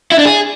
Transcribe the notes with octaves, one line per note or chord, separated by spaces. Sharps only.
E4
D4
G#4